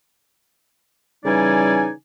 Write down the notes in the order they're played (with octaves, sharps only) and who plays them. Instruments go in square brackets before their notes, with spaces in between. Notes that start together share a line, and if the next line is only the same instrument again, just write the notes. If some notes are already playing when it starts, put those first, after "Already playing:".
[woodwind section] C#3 E3 G3 D#4 D5 G#5